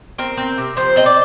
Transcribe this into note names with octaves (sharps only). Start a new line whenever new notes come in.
C4 A#4
C4
C3
F3 C5
C4 D#5
D5